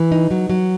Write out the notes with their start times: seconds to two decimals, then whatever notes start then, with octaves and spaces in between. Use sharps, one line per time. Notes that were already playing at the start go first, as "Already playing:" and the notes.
Already playing: E3
0.12 D#4
0.31 F#3
0.50 F#3